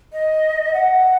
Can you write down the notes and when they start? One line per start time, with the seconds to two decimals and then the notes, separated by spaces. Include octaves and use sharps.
0.13 D#5
0.73 F#5